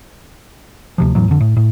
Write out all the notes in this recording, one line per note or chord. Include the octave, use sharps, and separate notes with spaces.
D2 C3 F3
E2 A2 E3 F#3
F2 D3
A2
A2